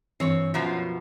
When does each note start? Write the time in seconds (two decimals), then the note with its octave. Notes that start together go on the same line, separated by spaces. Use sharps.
0.20 G2 E3 C4 C#5
0.54 F#2 B2 F3 C#5